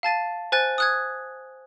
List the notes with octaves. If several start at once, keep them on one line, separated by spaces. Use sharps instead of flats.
F5 A5 A6 D#7
C5 G#5 F#6 A6
D#6 F#6 G#6